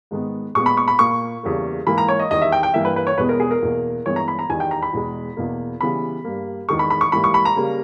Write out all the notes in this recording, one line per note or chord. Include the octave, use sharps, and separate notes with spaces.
G#2 D#3 G#3 B3
A#2 G#3 B3 C#6
B5
C#6
B5
A#2 A#3 C#6
E2 C#3 G3 A#3
G#2 E3 A#3 B5
A#5
C#5
D#5
E2 D#3 G3 D#5
E5
G5
G5
G2 E3 A#3 E5
B4
B4
C#5
E2 B2 G#3 B3 B4
A#4
G#4
A#4
E2 B2 A#3
G2 E3 G#3 B3 C#5
A#5
B5
A#5
E2 D#3 G3 G#5
G5
A#5
B5
E2 B2 G#3
E2 B2 A#3
C#3 E3 G3 B3 B5
G2 G3 A#3
E2 D#3 G#3 C#6
B5
B5
C#6
G#2 E3 G3 A#3 B5
C#6
B5
A#5
C#3 G3 A#3